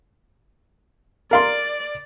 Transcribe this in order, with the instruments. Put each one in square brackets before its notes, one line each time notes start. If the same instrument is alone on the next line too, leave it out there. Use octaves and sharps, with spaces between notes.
[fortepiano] A#4 F5 C6 [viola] D5